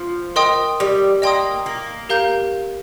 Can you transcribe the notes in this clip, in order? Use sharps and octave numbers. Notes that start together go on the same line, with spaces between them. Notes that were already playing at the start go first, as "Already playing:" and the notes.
Already playing: F3
A#4 D#5 G5 C6 D#6
G3
A#3 D#5 G5 C6 D#6
A#3
G4 A#4 F5 A#5 G6